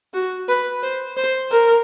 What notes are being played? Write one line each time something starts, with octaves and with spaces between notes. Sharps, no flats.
F#4
B4
C5
C5
A#4